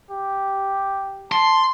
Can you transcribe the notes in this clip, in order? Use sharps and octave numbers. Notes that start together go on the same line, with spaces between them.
G4
A5 C6